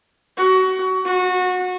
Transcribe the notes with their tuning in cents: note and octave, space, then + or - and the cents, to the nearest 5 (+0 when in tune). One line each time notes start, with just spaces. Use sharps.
F#4 +25
F#4 -25